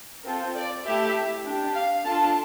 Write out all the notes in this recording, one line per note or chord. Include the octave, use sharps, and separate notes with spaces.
C4 F4 A4 A#4
D5
A3 E4 G4 E5
D4 G4
F5
D4 F4 A4 A5